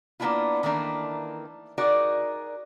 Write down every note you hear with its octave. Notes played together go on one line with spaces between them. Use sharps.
A#3 B3 C#4 D4 E4 F4
D#3 E3 A3 A#3 D4
D#4 F#4 G#4 A#4 D5